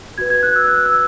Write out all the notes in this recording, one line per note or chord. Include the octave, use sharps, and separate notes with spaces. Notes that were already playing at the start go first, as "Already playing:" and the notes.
F#4 B4 G#6
G#6
F#6
E6
F#6
E6